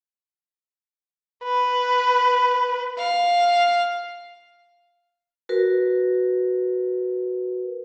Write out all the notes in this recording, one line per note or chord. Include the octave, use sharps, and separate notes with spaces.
B4
F5
F#4 A#4 B4